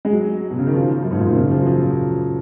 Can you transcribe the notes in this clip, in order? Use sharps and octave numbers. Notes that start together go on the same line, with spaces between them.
G#3
F#3
B2
C#3
D#3
F3
F#2
G#2
A#2
B2
C#3
F3
F#3
F3